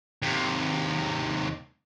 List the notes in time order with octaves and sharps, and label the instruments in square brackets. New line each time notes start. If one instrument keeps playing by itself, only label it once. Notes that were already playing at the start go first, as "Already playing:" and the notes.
[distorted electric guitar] D#2 C3